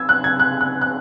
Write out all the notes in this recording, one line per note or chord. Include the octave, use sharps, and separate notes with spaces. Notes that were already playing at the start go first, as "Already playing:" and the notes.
Already playing: E6 G#6
F#6
G#6
F#6
F#6
F#6